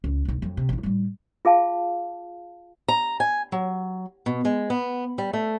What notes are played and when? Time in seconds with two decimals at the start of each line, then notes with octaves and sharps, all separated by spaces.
0.04 C#2
0.25 D1 B1
0.42 F2 F#3
0.57 C3
0.69 A1 E4
0.83 A2 G3
1.45 F4 G#4 F5 A5
2.88 A#5
3.20 G#5
3.52 F#3
4.26 B2
4.45 G#3
4.70 B3
5.18 G3
5.33 A3